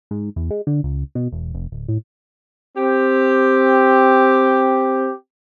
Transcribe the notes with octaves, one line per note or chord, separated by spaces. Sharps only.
G#2
E2
G#3
D3
C#2
B2
E1
F1
D1
A2
C4 G4